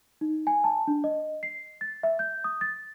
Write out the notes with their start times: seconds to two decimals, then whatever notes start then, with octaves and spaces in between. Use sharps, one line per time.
0.21 D#4
0.47 G#5
0.64 A5
0.87 D4
1.04 D#5
1.43 C7
1.81 A6
2.03 E5
2.19 G6
2.44 D#6
2.61 A6